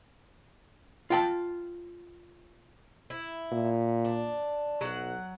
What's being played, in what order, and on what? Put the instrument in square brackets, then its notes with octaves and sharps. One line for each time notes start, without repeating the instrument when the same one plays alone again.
[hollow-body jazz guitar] F4 G5 A5
[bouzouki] E4
[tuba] A#2
[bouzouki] D4
[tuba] B1 [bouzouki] F#3 F#5